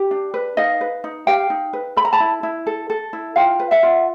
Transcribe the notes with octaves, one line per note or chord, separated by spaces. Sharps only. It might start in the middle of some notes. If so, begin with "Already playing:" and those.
Already playing: G4
D4
B4
D#4 D#5 F5
B4
D#4
G4 F5 G5
D#4
B4
A4 B5
A#5
A5 B5
E4
E4
A4
A4
E4
F4 F5 G5
B4
E5 F#5
F4